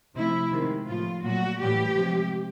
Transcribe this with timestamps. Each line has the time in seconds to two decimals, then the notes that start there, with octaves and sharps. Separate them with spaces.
0.15 C3 F3 A3 E4
0.51 C3 D#3 G#3
0.87 A2 F3 A3 F4
1.23 A#2 F#3 A3 F#4
1.59 A2 E3 G3 G4
1.95 C3 F3 G#3